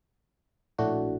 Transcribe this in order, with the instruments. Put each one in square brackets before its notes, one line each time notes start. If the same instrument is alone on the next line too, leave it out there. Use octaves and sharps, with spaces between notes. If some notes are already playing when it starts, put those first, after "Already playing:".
[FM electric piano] A#1 A2 A3 D4 F#4